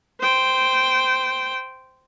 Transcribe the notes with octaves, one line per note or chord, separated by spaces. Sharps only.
C5 G5